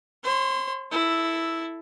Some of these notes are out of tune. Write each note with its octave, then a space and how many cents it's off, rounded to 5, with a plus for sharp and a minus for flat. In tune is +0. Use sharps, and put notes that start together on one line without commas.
C5 +45 C6 -30
E4 +0 A4 +0